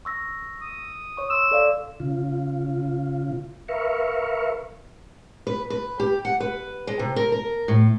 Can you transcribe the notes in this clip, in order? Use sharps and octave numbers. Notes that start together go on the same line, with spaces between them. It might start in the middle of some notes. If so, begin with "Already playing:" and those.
C#6 E6 A#6
D#6
C#5 C#6
C6 E6
A4 D5 F5
C#3 F4
A#4 B4 E5 F5 C#6
B4
B4
G4
F#5
B4
G#3
C3
A#4
A#4
A2